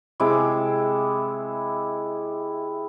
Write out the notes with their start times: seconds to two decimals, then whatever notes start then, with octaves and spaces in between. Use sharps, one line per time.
0.20 C3 G#3 E4 D6